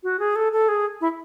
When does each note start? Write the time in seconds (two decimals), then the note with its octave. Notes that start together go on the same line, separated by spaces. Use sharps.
0.03 F#4
0.19 G#4
0.36 A4
0.52 A4
0.69 G#4
1.01 E4